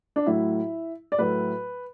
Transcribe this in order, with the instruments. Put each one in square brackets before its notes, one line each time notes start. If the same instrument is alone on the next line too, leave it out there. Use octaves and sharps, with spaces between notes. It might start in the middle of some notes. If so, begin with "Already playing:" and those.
[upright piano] D4
A2 F#3 A3 E4
D5
A2 F#3 A3 B4